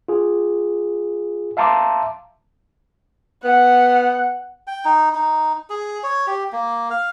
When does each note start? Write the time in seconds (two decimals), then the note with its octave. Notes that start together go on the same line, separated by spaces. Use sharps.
0.08 F4 G#4
1.57 E5 F5 A5 A#5 C6 D6
3.44 B3 F#5
4.67 G5
4.85 D#4
5.15 D#4
5.70 G#4
6.03 C#5
6.27 G4
6.53 A#3
6.90 F5